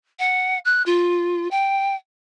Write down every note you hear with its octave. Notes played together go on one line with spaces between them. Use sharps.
F#5
F#6
F4
G5